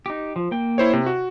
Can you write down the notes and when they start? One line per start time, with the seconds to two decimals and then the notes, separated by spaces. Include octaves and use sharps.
0.06 D#4 G4
0.36 F3
0.51 A#3 G5
0.78 E4 C5 C#5
0.93 C3
1.06 F#4